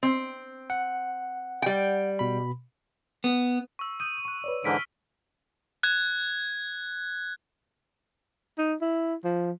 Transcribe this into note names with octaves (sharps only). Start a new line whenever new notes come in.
C4
F#5
G3 G5
B2 B5
B3
C#6 E6
D#6 G6 D#7
C#6 F#6
B4 C#5 D5
G#2 D3 E3 F6 B6 D7
F#6 G#6
D#4
E4
F3